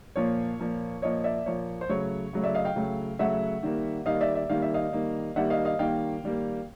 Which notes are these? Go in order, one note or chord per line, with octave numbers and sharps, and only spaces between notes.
A#2 F3 A#3 C#5
A#2 F3 A#3
A#2 F3 A#3 C#5 D#5
D5 E5
A#2 F3 A#3 C#5
C5
C#3 F#3 A3 C#5
C#3 F#3 A3
D5 E5
D#5 F5
F5 G5
C#3 F#3 A3
C#3 F#3 A3 E5 F#5
D#3 G3 A#3
D#3 G3 A#3 D#5 F5
D5 E5
D5 E5
D#3 G3 A#3 F5
E5
D#5 F5
D#3 G3 A#3
D#3 G3 A#3 E5 F#5
D#5 F5
D#5 F5
D#3 G3 A#3 F5 G5
D#3 G3 A#3